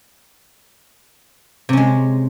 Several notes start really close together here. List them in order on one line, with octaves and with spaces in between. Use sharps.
C3 C#4 G#3